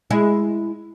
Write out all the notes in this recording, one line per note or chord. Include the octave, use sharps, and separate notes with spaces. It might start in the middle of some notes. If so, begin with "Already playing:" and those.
G#3 E4